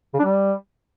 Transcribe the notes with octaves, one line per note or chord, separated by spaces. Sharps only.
C#3
D4
G3